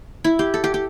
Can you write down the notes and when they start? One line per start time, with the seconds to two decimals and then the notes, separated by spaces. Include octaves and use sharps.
0.24 E4
0.39 G4
0.54 A4
0.64 G4
0.74 G4